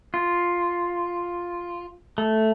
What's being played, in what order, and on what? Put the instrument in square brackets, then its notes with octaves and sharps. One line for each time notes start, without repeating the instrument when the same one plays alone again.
[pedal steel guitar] F4
A3